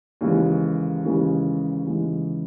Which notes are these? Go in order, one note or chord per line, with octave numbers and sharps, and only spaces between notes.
D#2 C#3 E3 G#3
D#2 C#3 E3 G#3
D#2 C#3 E3 G#3